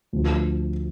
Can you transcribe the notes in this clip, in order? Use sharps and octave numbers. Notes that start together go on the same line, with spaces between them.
D2 D3 F3